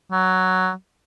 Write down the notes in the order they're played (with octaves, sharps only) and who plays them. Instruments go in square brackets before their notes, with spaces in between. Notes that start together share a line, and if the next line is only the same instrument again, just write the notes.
[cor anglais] F#3